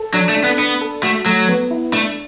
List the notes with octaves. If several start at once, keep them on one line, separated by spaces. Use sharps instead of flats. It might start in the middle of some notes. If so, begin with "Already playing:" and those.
Already playing: A4
F#3 D4
A3
D4
B3
B3 D4
A4
A3 F#4
F#3 A3
B3
E4
A3 D4